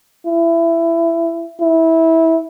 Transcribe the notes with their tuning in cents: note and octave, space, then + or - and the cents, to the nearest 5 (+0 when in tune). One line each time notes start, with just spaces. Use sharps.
E4 +20
E4 -20